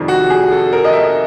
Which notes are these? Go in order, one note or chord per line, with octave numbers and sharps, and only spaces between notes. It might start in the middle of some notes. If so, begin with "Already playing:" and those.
Already playing: F2 C3 D#3 G3
F#4
G#4
A4
A#4
D#5
E5